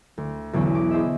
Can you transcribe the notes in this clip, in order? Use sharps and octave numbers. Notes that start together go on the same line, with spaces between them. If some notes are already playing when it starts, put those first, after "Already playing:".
D2
B1 E2 D3 C#4
D6
E4 G#4 C5 D#5 E5